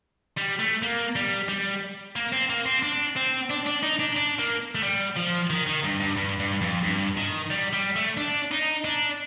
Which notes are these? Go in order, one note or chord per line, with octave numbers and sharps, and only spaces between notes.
G3
A3
A#3
G3
G3
A#3
C4
A#3
C4
D4
C4
D4
D4
D#4
D4
D4
A#3
A3
G3
F3
D#3
D#3
G2
G2
G2
G2
F2
G2
D#3
G3
G3
A3
D4
D#4
D4